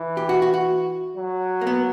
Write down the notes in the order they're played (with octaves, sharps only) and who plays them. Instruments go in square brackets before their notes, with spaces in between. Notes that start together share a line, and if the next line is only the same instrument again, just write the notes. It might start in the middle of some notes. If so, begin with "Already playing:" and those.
Already playing: [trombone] E3
[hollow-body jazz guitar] G4
F#4
F#4
F#4
[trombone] F#3
[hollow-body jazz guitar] A#3
B3